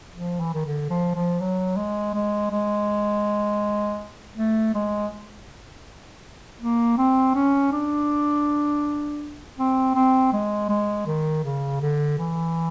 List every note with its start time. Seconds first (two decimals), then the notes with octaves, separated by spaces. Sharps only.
0.15 F3
0.40 E3
0.54 D#3
0.66 D3
0.90 F3
1.15 F3
1.40 F#3
1.76 G#3
2.14 G#3
2.51 G#3
4.37 A3
4.74 G#3
6.61 A#3
6.98 C4
7.35 C#4
7.72 D4
9.58 C4
9.95 C4
10.33 G#3
10.69 G#3
11.07 D#3
11.44 C#3
11.81 D3
12.18 E3